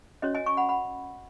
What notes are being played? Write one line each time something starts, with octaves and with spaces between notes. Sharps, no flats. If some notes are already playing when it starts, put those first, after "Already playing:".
C#4 F#4 C#5 D#5
D#5 G#5
G#5 C#6
F#5 B5
F#5 B5